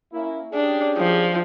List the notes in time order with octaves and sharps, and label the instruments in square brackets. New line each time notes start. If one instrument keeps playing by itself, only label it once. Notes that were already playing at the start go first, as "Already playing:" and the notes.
[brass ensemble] A#3 C#4 E4
[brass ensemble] C#4 G4 G#4 [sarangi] D4
[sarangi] F3